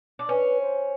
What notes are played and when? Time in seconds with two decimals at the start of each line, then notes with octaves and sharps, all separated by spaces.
0.19 D4
0.28 C#4 B4
0.60 C5